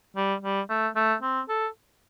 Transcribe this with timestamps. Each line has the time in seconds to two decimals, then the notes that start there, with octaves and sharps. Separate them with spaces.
0.16 G3
0.42 G3
0.69 A3
0.96 A3
1.22 C4
1.49 A4